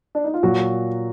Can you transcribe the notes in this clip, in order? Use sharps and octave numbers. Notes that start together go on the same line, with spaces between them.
D4
D#4
F4
A#2 F#3 F#4